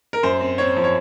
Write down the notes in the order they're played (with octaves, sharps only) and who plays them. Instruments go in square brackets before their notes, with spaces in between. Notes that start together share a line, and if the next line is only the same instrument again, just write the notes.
[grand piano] A#4
F#2 C5
C4
C4 C#5
F3
C#5